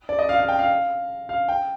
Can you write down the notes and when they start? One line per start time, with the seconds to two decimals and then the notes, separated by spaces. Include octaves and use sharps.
0.09 D5
0.19 D#5
0.29 F5
0.39 F5
0.49 G5
0.59 F5
1.29 F5
1.49 G5